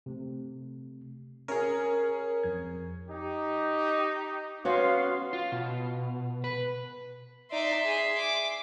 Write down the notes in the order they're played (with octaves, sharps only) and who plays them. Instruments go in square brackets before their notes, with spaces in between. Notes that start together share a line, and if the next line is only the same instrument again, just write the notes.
[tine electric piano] C3 A3
[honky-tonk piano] C#4 G#4 [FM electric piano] A#4 [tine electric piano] E5 D#6
[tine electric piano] F2 F3 G#6
[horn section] D#4 G4
[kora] B3 C#4 F#4 [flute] F5 [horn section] C6
[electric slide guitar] F4
B2
B4
[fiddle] D#4 D5 [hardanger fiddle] E5 C6
[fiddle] G#4
D6